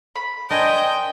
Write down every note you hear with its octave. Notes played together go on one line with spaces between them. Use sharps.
B5
D4 A#4 C5 D#5 G5 G#5